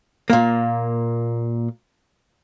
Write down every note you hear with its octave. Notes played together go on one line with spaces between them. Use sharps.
A#2 A#3